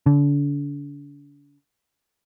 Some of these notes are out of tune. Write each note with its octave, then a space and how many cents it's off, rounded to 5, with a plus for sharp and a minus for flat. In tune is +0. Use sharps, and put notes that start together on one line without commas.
D3 -40